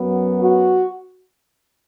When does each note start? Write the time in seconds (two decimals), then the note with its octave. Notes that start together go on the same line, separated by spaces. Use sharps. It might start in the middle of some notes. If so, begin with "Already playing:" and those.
Already playing: F#2 F#3 B3
0.41 F#4